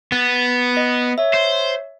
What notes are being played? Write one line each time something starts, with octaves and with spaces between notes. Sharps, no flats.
B3 F#6 A6
D#5
C#5 E5
C5